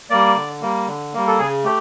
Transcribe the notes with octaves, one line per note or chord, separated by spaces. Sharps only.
G3 A#3 D5
D3
G3 A#3
D3
G3 A#3
A4
C#3 G#4
A3 G4